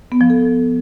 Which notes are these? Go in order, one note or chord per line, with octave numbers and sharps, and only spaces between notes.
B3
F3
A4